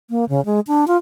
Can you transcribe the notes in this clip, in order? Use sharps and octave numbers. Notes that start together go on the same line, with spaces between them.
A#3
C#3
G#3
D4
F4